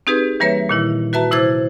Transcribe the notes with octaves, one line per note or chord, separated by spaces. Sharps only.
C4 D#4 G4 G#4 B4
E3 G3 A#3 B4 C#5 E5
A#2 D#3 E4
F#4 B4 E5 A5 A#5
C3 E4 C5 D6 G#6 A6